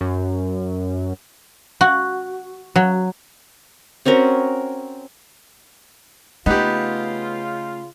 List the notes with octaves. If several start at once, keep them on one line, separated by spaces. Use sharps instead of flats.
F#2
F#4
F#3
C4 C#4 F#4 A#4
C#3 A3 B3 D#4 F4 G4